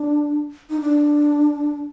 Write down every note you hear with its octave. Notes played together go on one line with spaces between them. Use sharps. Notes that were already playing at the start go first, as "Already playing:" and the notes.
Already playing: D4
D#4
D4